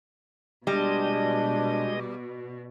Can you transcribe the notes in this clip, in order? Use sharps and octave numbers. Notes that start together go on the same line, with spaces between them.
B2 G3 G#3 D4 D#5